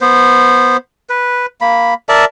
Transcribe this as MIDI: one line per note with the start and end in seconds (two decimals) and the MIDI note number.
0.01 0.77 59
0.01 0.77 72
1.09 1.46 71
1.61 1.94 58
1.61 1.94 83
2.09 2.25 70
2.09 2.25 74
2.09 2.25 76
2.09 2.25 81